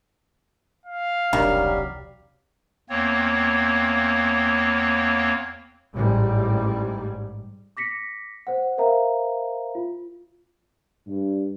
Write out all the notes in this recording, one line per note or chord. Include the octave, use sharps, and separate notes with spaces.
F5
E1 C2 D#3 F#3 G3 D4 G4
E2 A#3 C4 C#5
A1 G#2 G3
D6 A#6 B6 C#7
C5 F#5
A#4 C5 E5 F5 A#5
F4
G2